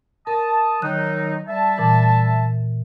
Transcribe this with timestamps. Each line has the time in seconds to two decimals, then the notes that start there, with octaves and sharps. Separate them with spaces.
0.27 A#4 A5 D#6
0.82 D#3 F#3 D#4 F#6
1.48 G3 E5 A5
1.78 A#2 E3